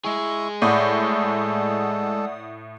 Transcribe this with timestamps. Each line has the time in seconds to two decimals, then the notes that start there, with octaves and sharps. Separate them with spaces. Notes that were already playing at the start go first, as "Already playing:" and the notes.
0.05 G#3 E4 G#4 C#6
0.62 A2 A4 D5 F#5 D#6